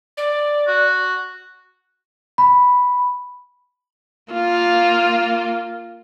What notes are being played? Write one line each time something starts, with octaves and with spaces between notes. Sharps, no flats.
D5
F#4
B5
A#3 F4